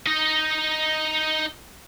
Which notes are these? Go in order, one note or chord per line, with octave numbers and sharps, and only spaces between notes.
D#4 D#5